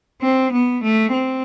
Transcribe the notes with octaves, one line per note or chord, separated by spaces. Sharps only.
C4
B3
A3
C4